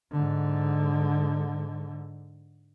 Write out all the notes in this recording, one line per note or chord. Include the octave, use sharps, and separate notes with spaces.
G#2 D3